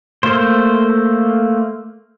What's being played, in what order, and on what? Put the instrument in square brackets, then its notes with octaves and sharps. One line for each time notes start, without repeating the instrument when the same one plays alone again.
[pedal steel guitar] A3 A#3 C5